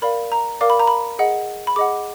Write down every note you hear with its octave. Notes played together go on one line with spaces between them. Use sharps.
A#4 D5 F5 B5
A#5
A#4 D5 F5 D6
B5
A#5
B5
G#4 D#5 F#5
B5
G#4 D#5 F#5 D6